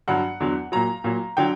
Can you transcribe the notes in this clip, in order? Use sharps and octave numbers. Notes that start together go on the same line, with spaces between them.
G2 D3 F#3 F#5
E2 D3 F#3
A#2 F#3 A#5
A#2 F#3
D3 F#3 G5